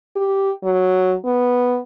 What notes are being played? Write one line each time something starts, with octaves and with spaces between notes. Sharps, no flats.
G4
F#3
B3